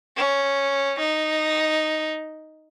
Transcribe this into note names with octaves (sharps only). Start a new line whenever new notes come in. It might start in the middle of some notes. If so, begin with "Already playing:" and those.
C#4
D#4